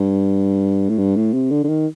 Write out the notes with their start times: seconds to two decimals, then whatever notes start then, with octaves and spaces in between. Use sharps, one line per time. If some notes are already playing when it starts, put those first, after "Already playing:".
Already playing: G2
0.89 A2
0.98 G2
1.16 A2
1.34 C3
1.51 D3
1.64 D3
1.69 D#3